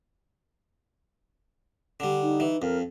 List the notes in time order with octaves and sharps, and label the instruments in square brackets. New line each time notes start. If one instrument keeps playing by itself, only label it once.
[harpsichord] D3 G3
[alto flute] D#4
[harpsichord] E3
[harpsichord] F2 [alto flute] A#4